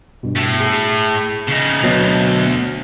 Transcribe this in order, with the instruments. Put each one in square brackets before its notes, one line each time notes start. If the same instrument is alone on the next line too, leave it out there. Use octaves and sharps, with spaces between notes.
[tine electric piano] G2 B2
[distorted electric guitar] A2 A3
[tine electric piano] G#4
[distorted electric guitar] C#3 D#4
[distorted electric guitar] D2 [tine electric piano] B2 F#3